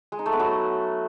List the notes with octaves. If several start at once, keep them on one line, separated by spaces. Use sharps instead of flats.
G#3
D#4
A3
B3
F#3